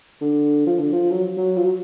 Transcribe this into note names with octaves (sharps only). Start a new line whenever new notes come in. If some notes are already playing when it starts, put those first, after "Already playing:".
D3
F3
D3
F3
F#3
F#3
F3
F#3